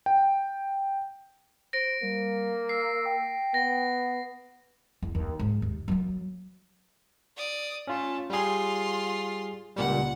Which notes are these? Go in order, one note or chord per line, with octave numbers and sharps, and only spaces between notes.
G5
C5 A#6 D7
G3 A#3
E6 C7
G5
B3 A#6
E2
D#2
G#2
D#2
F#3 A#3
D5 D#6
A3 C#4 F4 A5
G3 F4 G#4 C6
C#2 A#2 G3 F#5